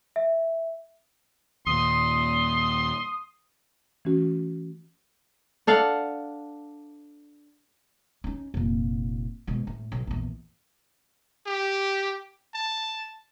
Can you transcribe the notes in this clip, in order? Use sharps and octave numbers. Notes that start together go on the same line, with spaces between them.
E5
D#2 A#2 C6 D#6
E3 A3 C#4 F#4
D4 A4 F5 F#5
C#4 D#4
F1 A#2
G#2 B2
A2
B1
A#1 E2
G4
A5